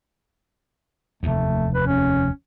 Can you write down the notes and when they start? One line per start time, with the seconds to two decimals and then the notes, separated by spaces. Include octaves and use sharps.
1.23 F1 D#2 A3
1.74 B4
1.87 C#4